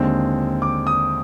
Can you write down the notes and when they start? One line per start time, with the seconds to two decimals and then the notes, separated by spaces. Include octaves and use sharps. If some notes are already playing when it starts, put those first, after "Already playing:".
Already playing: D#2 D3 G#3 C4
0.62 D6
0.87 D#6